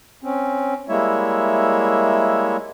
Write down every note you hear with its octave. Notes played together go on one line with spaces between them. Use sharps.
C4 C#4
G3 G#3 A#3 E4 C#5 E5